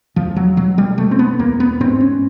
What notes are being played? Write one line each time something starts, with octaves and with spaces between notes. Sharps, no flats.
E2 F3
F#3
B2 F#3
G3
B2 A3
C4
B3
E2 A#3
B3
G#2 C4
C#4